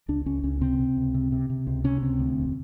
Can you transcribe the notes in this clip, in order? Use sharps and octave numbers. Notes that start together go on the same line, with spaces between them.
C#2 D4
C#2 C#4
C#2 C#4
C3 C4
C3
C#2
C3
C3
C3
C#2 C4
C3 C#4
C#2 C4
D2
E1